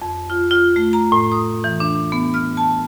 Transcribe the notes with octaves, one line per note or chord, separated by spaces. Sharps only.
F2
F4
F4
A3
A#5
A2
D#6
E3
D4
B3
F6
A5